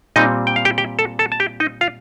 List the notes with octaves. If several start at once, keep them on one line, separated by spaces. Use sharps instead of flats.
A#2 G3 C4 D#4 D#5
G5
F5
G4 G5
G4 G5
A4 A5
A4 A5
A5
G4 G5
D#4 D#5
F4 F5